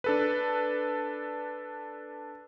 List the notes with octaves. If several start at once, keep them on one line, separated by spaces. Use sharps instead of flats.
D4 A4 B4